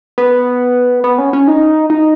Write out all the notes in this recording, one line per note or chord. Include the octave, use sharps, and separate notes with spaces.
B3
B3
C#4
C#4
D#4
D#4